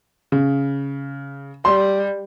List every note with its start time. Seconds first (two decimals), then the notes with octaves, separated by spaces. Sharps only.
0.32 C#3
1.65 G3 C6